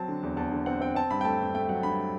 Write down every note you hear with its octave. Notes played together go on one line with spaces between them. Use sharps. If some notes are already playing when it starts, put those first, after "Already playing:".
Already playing: F#3 C4 A5
D3
E2
E2 A5
D3
C4 F#5
C4 G5
C4 A5
G2 B5
G5
A3 A5
G2
A3 G5
F#3 F#5
G2 B5